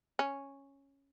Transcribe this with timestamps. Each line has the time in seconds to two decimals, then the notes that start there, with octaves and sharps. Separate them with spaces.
0.19 C#4